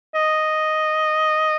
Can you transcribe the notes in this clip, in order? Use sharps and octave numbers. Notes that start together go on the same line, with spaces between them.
D#5